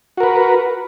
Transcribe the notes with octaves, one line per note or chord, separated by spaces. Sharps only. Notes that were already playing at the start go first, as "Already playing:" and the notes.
F#4 A#4 B4